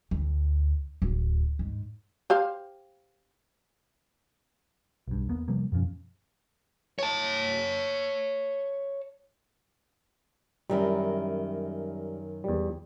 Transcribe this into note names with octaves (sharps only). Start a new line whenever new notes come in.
D2
D1
G#2
G4 C5 F5
B1 G2
E2 A#3 B3
C3 F3 G3 A#3
F#2 B2 F3 C#4
C#5 A5
F#2 D#3 G3 E4
E2 G3